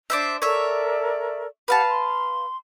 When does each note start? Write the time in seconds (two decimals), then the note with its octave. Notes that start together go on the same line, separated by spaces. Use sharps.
0.10 D4 C5 E5
0.42 A4 A#4 C#5 D5 E5
1.68 G4 B4 F5 F#5 A5
1.87 C6